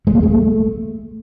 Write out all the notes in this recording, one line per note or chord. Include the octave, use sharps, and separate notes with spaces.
G#3
A#3
G#3
A3